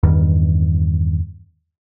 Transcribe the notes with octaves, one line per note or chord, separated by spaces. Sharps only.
E2 G2 D#3